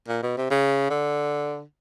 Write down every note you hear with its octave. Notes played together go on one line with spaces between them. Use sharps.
A#2
B2
C3
C#3
D3